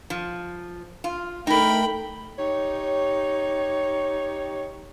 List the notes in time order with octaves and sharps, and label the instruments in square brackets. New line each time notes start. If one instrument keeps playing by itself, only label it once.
[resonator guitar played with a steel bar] F3
F4
[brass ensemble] A3 [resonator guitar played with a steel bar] D#4 A#4 [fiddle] G5 B5
[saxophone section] D#4 G4 C#5